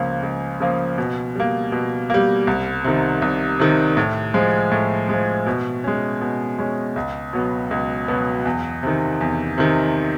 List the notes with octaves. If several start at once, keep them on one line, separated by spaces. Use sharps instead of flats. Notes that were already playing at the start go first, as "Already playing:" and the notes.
Already playing: C#2 C#3 F3 A#3
C#2
C#3 F3 A#3
B2
G3 A#3
B2
G3 A#3
C2
C3 D#3
C2
C3 D#3
A2
F3 G#3
A2
F3 G#3
B2
G#3 C#4
B2
G#3 C#4
C#2
B2 F#3 B3
C#2
B2 F#3 B3
E2
C3 D#3
E2
C3 D#3